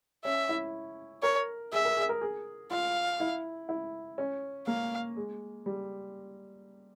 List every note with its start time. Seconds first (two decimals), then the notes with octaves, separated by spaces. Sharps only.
0.25 C#4 E5
0.49 E4
1.23 A#4 C#5
1.73 G#4 E5
1.85 A#4
1.97 G#4
2.09 A#4
2.21 G#4
2.71 F4 F5
3.20 E4
3.69 E4
4.18 C#4
4.67 A#3 F5
5.16 G#3
5.66 G3